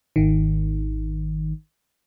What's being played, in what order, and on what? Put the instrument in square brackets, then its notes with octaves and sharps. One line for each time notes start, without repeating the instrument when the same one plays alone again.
[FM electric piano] G#1 D#3